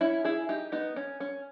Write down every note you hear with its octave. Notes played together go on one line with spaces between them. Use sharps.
C#4 E4
E4 G#4
D#4 G4
B3 D#4
C#4
C#4